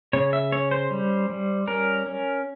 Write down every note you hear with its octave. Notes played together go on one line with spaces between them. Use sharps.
C#3 C#5
E5
C#4 C#5
C5
G3
G3
C#4 A#4
C#4